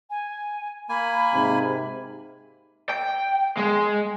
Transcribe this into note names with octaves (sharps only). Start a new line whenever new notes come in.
G#5
A#3 G#5 B5
G#2 C3
G5
G#3